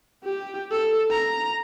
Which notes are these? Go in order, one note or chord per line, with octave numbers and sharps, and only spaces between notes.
G4
A4
A#5